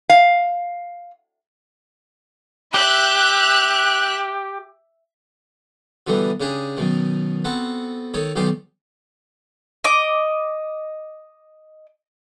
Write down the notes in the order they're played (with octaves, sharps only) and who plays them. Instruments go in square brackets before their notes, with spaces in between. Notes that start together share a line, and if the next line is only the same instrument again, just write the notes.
[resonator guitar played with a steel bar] F5
[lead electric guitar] G4 [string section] E5 F#6
[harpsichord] B2 D3 E3 G3 B3
C#3 D4 G4 G#4
F#2 B2 D#3
B3 C4 F#4 A4
D#3 A4 C#5
B1 B2 D#3 G4 D5 C6
[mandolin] D#5 D6